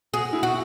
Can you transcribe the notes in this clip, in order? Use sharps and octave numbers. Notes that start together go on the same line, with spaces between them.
F#4 G#4
E4
F#4